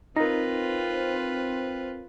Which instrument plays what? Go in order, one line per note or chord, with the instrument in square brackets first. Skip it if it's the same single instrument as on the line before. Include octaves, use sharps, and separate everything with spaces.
[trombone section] C4 [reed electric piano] D#4 [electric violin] F4 B4 [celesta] A#4 A#6